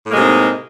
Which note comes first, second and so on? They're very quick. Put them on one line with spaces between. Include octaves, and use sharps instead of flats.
A2 A#3 G#3 C3 D#4